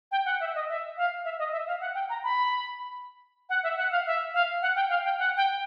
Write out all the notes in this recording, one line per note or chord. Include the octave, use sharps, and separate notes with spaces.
G5
F#5
E5
D#5
E5
F5
E5
D#5
E5
F5
F#5
G5
A#5
B5
F#5
E5
F#5
F5
E5
F5
F#5
G5
F5
G5
F#5
G5